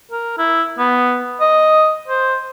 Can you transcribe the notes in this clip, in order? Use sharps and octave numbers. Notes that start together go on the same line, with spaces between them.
A#4
E4
B3
D#5
C5